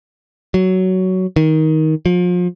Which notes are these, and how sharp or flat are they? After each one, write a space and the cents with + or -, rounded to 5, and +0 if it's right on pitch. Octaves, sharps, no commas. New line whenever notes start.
F#3 +10
D#3 +15
F3 +35